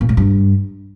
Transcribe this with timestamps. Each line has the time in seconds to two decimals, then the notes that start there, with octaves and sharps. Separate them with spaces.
0.01 A#2
0.09 A2
0.17 G2